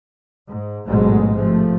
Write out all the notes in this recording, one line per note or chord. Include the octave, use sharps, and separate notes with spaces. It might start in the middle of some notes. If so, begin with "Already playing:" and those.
G#2
A1 G#2 B2 F#3 G#3 A3
C3 F3 A3